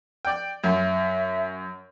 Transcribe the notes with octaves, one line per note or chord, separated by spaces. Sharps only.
D5 G5
F#2 E5